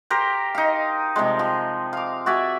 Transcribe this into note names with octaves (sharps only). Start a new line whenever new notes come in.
G4 A#4 C5
D#4 F5
C3 F3 G3 G#3
F3
F5 D6
F#4 D5 E5 G#5